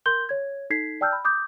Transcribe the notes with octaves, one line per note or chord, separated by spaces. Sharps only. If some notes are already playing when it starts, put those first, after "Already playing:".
A#4 C6 G6 G7
C#5 G#6
D#4 A4 G#6 B6 C7
D5 G5 A5 E6 F6 G6
B5
D6 D#6 G6